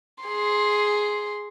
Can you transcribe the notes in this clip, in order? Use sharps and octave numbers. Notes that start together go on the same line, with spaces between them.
G#4 C6